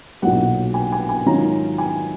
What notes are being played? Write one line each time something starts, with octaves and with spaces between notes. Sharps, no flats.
B1 A#2 F#3 F#5
G#5
G#5
G#5
G#2 D#3 F#3 C#4 F4 A#5
G#5